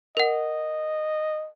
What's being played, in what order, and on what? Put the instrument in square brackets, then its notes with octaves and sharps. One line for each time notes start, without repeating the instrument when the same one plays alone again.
[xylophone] A#4 F#5 [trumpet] D#5